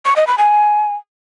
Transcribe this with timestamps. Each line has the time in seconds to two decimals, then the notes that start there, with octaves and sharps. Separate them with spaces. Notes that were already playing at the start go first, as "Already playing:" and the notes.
0.05 C#6
0.16 D#5
0.27 B5
0.38 G#5